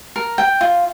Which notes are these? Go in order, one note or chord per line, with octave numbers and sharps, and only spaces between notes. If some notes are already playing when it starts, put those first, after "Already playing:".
A#4
G5
F4